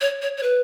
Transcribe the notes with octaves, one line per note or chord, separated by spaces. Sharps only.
C#5
C#5
C#5
B4